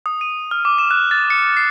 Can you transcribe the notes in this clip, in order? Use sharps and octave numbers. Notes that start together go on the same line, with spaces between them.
D#6
D#7
F6
D6
E7
F#6
A6
C#7
C7